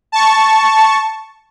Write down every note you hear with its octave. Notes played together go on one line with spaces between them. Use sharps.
A5 C#6